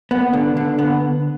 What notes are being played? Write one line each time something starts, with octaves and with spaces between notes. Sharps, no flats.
B3
D3
D3
B3